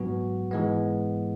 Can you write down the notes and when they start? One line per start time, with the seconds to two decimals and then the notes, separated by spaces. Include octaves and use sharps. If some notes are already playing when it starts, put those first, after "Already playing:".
Already playing: G#2 F#3 B3 F#4
0.51 G#2 E3 G#3 B3